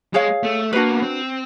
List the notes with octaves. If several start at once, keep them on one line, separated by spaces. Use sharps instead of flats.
G#3 G#4 C#5 F5
A3
A#3 D4 F#4 B4
B3
C4